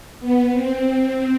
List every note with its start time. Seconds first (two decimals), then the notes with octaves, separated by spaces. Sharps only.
0.20 B3
0.52 C4